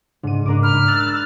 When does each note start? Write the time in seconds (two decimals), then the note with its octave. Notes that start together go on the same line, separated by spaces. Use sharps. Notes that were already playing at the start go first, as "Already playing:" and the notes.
0.23 G#2 C#3 D4 D#7
0.46 G#2 C#3 D4 A#4 D6
0.63 B5 F6
0.88 E6 F#6 A6